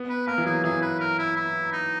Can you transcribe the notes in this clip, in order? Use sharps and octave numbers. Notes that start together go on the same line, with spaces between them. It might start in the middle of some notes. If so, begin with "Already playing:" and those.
Already playing: B3
B4
A#3 A#4
E3
F#3 G#4
E3 G#4
B4
A#4
E4
E4
D#4